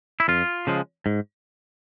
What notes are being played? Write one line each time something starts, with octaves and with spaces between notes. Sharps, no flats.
E4
F2 F4
C#3 F3 G#3
G#2